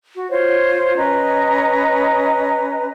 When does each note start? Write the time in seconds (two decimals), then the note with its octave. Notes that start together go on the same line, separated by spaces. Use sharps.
0.15 F#4
0.30 F4 C5 C#5
0.96 C#4 B4 D#5 A#5